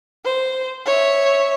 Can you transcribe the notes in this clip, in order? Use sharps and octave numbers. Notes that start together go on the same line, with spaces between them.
C5
C#5 E5